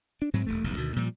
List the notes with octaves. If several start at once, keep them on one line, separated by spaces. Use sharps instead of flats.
D4
G#2 F#3 C4
D#1 D#2 A3
F1 B1 G2
D2 B2 D#3
A#2 F3 G3